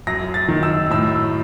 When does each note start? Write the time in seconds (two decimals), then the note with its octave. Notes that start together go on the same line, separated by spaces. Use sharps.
0.07 F#2 A#6
0.34 A6
0.49 D#3
0.63 E6
0.91 A2 E6